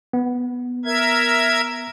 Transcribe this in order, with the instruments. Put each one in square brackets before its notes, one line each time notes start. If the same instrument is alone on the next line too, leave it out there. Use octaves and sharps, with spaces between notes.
[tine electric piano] B3
[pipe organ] A#4 E5 G#6